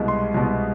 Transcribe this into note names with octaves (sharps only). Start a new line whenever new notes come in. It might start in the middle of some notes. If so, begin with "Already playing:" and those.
Already playing: C2 B2 G#3
C6
C2 B2 G#3